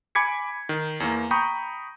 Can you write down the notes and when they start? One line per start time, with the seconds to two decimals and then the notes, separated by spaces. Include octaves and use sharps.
0.15 G#5 B5 D6 G#6 B6 C#7
0.69 D#3
1.00 E2 A#3
1.31 G5 A#5 B5 C#6 D#6 G6